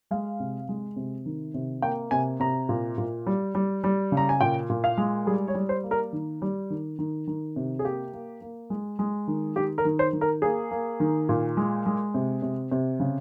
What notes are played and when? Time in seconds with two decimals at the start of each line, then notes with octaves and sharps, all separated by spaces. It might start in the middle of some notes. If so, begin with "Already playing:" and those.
0.11 G#3 F5
0.40 C3
0.69 G#3
0.96 C3
1.26 D#3
1.54 C3
1.82 A#3 G5
2.11 C3 G#5
2.40 C3 A#5
2.69 A#2
2.98 A#2
3.26 G3
3.55 G3
3.84 G3
4.12 C#3
4.17 A#5
4.29 G#5
4.41 A#2 G5
4.70 A#2
4.84 F5
4.98 G#3
5.27 G3 G#4
5.48 C#5
5.55 G3
5.69 C5
5.84 A#3
5.91 A#4
6.13 D#3
6.42 G3
6.70 D#3
6.99 D#3
7.27 D#3
7.56 C3
7.79 G#4
7.84 A#3 G4
8.13 A#3
8.41 A#3
8.70 G#3
8.99 G#3
9.28 D#3
9.56 D#3 G4
9.78 A#4
9.85 D#3
9.99 C5
10.13 D#3
10.21 A#4
10.42 A#3 G#4
10.71 A#3
11.00 D#3
11.29 A#2
11.57 G#3
11.86 G#3
12.14 C3
12.42 C3
12.72 C3
13.00 C#3